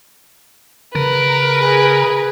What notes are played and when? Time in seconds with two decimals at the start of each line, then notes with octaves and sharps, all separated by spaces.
0.95 C#3 A#4 B4
1.62 G#4